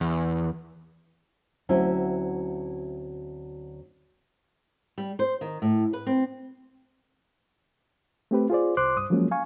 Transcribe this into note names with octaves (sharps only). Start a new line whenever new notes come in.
E2
D2 F#3 C4 C#4 E4 C5
G3
C5
D#3
A2
B4
C4
A3 C4 G4 B4
F4 G#4 C5 D5
C2 C5 C6 D6 F#6
G2 D#6
F3 F#3 G#3 A#3 C#4
F5 G#5 C#6